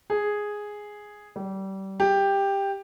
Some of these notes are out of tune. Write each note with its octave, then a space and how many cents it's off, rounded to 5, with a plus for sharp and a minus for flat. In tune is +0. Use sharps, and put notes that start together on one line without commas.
G#4 +0
G3 -25
G4 +10